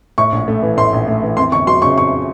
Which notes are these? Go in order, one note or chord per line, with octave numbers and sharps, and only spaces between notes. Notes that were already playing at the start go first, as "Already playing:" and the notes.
A2 C#6
A#1
A3
E3
A2 C6
A#1
A3
E3
F2 C6
G1 C#6
F#3 C6
C#3 C#6
F2 C#6